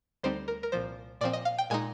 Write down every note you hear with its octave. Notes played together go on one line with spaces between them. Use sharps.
D2 D3 G3 C4 D#4 C5
A#4
A#4
C2 A#2 F3 C5
A#2 F3 C4 D5
D#5
F5
G5
A#2 G#3 D#4 G#5